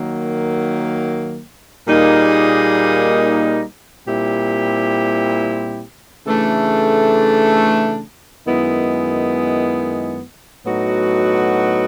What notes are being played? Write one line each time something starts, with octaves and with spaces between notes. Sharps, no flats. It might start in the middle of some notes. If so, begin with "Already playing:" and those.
Already playing: D#3 F#3 A#3
A#2 G3 A#3 D#4 G#4
A#2 G3 C4 E4 G4
C#3 E3 A3 D4
F#2 D#3 G#3 B3 E4
A2 F#3 B3 D#4 F#4